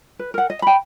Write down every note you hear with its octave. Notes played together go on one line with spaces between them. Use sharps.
B4
A#4 F#5
D#5
G5 B5